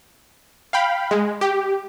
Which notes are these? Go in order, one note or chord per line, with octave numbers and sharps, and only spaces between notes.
F5 G5 B5
G#3
G4